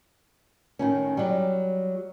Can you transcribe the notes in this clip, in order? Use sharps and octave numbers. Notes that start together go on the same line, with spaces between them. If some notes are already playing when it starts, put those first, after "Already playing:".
A2 D#3 C#4
F#3 G3